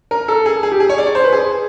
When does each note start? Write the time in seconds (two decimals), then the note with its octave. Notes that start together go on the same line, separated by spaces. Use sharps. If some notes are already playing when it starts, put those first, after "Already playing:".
0.11 A#4
0.28 A4
0.46 G#4
0.63 G#4
0.72 G4
0.80 G#4
0.89 C#5
0.98 D5
1.07 C#5
1.15 C5
1.24 B4
1.33 G#4